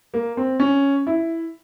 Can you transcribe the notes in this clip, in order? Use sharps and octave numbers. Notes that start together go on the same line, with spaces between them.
A#3
C4
C#4
E4